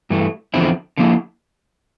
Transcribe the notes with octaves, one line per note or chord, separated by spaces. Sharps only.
G2 E3 A3
E2 D3 F3 C4 E4
D3 F3 A#3 E4